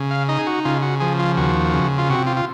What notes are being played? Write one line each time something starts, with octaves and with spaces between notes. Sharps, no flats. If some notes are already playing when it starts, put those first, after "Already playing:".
Already playing: C#3
F5
D#4 D#5
G#4
F#4
C#3 F4
F#4
F3 G#4
F4
D#2 F#4
C#3
F4
C3 F#4
F4
F4